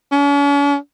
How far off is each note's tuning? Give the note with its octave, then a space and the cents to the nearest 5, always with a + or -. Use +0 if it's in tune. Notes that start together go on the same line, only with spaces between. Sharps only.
C#4 +45